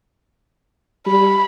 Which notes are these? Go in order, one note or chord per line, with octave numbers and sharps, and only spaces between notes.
G3 B5